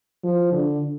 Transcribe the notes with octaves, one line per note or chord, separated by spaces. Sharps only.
F3
D3